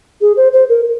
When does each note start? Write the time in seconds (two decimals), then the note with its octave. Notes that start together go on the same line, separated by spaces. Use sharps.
0.21 G#4
0.37 C5
0.53 C5
0.69 A#4